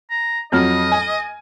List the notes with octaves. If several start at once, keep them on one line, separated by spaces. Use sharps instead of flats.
A#5
F2 F#3 D#5 F6
G#5